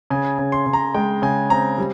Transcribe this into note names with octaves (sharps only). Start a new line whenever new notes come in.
C#3 G#5
C#3
C6
C#3
A#5
G#3 G5
C#3 G#5
C4 A#5
G3